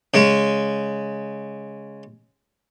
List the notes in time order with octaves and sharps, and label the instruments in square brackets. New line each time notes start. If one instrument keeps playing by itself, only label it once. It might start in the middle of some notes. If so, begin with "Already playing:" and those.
[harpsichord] C#3 G#3